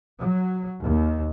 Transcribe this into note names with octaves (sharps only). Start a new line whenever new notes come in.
F#3
D#2